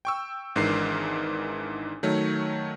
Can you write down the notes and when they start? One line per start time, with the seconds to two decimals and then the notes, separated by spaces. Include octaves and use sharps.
0.05 G5 C#6 E6
0.55 G#1 G#2 E3 D4 A#4 C7
2.03 D#3 F#3 A3 C#5